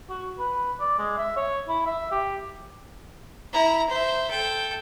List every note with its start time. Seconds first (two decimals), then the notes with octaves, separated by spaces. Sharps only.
0.10 F#4
0.39 B4
0.80 D5
0.99 G#3
1.18 E5
1.37 C#5
1.68 E4
1.86 E5
2.11 G4
3.53 E4 A#5
3.89 C5 E5
4.30 A4 G5